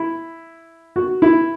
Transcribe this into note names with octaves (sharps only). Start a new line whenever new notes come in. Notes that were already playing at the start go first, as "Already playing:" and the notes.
Already playing: E4
F#4
E4